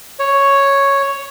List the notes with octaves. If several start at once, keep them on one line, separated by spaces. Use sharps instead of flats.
C#5